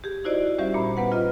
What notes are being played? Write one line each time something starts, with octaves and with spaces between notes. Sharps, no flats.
G4 G#4
D#4 E4 F#4 C5 D5 D#5
G3 C#4 G4 C5 E5 F5
A#2 A#5 B5
B3 B4 F#5
F4 D#5